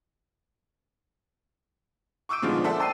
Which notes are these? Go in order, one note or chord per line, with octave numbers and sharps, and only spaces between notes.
C#6 D6 E6 G6 D7
A#2 D3 D#3 F3 G#3 B3
A4 C5 D5 E5 F#5 E6
G5 A5 E6 C7 D#7